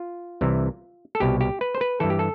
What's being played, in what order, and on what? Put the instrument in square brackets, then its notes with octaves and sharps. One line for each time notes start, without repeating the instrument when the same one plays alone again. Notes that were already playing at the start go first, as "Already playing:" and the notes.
Already playing: [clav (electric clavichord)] F4
C2 C3 E3
A4
C2 B2 G4
G4
B4
C5
B4
G2 E3 A4
G4
A4